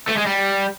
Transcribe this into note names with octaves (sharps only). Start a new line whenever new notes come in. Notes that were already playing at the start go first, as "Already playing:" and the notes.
A3
G#3
G3